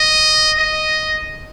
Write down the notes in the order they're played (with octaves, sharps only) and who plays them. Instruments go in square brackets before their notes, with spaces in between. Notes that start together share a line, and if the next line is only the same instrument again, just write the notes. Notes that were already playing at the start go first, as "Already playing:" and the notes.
Already playing: [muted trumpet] D#5
D#5